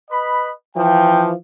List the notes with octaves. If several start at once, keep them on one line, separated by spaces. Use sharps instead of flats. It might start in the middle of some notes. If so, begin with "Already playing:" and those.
B4 D#5 B5
E3 F3 G5